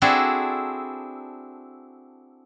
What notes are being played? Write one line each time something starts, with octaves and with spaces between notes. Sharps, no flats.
C4 D4 E4 F#4 G#4 A4